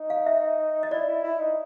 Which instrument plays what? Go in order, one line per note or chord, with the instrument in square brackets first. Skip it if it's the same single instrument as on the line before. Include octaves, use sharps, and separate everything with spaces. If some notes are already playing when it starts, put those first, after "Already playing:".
Already playing: [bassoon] D#4
[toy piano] F5
E5
D#5
[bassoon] E4 [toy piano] D5
[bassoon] E4
E4
D#4